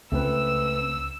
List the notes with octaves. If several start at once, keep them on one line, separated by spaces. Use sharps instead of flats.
C#2 A3 C4 B4 E6